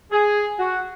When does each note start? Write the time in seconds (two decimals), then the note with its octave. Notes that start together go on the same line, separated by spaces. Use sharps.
0.12 G#4
0.59 F#4